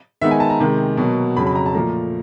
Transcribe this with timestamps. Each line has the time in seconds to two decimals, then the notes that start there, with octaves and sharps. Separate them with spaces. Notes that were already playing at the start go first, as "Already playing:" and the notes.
0.21 D#3 G#3 B3 D#4 E5
0.31 G#5
0.40 A5
0.50 A#5
0.60 C3 D#3 G#3
0.97 B2 F#3 A#3
1.36 F2 C#3 F#3 B5
1.46 B5
1.55 A#5
1.66 A5
1.75 A#2 F3 A3 A#5